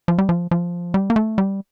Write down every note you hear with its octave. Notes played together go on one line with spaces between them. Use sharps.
F3
G3
F3
F3
G3
A#3
A3
G3